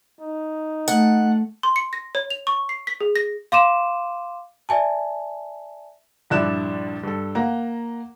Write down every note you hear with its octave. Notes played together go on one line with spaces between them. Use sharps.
D#4
A3 F#5
C6
C#7
A#6
C#5
F7
C#6
C7
B6
G#4
A#6
F5 C6 D6 D#7 E7
D5 E5 G#5 A5
A#1 G2 D4 E4 F#6 E7
G2 A4
A#3 F#5 A#5